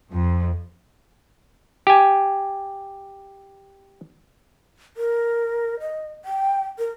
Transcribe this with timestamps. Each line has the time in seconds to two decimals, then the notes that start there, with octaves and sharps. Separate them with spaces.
0.11 F2
1.87 G4 G#5
4.97 A#4
5.80 D#5
6.25 G5
6.79 A#4